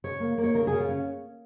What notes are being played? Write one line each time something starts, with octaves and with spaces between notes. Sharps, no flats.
C#3 C#5
A#3
A#3
C#5
C#3 A#4
G#4
C#3
F4
C#4